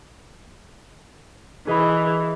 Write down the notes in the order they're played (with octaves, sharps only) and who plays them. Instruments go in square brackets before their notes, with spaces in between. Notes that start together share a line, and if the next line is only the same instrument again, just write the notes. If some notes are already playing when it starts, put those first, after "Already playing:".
[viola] E3 [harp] G#4 D#5 B5